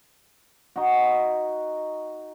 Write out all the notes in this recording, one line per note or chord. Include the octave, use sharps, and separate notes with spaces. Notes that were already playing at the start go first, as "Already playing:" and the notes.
D#4 F#4